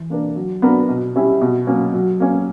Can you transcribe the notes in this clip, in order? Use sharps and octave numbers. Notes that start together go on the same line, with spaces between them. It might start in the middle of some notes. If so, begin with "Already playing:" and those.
Already playing: E3
A#3 D4 A#4
F#3
B3 D4 F#4 A#4
B2
G3 C#4 E4 G4
B2
F#3 A#3 C#4
F#3
A#3 C#4